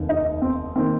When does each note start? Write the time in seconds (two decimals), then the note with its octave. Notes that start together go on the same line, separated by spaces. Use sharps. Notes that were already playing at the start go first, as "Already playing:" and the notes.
Already playing: F1 D#2 D#3
0.09 D#4
0.42 C4
0.76 D#3 A#3 C4